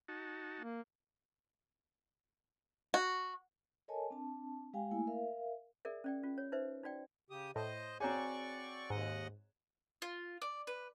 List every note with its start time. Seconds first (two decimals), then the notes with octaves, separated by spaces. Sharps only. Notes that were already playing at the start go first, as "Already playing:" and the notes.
0.08 D#4 F#4 A5
0.60 A#3
2.94 F#4
3.88 A4 A#4 C#5 D#5 G#5 A5
4.10 C4 D4 A5
4.73 G#3 G4 F5 G5 G#5
4.91 A3 A#3 E4 G#5
5.07 A#4 E5 F5
5.85 G#4 A#4 D5 E5
6.04 C#4 D5 G5
6.23 C#4 F4
6.38 C#5
6.52 D#4 B4 C5 E5
6.83 D#4 F#4 D5 G5
7.30 C#3 G4 D#6
7.56 A2 C5 D#5
8.00 C4 F#4 G#4 C#5 D5 G#5 A#5 C#6
8.90 D#2 G#2 D#5 F#5
10.02 F4
10.42 D5
10.67 B4